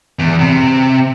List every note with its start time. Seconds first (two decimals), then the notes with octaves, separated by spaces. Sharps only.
0.19 E2
0.40 C3